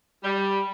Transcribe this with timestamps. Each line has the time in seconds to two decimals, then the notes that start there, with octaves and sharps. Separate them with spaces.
0.24 G3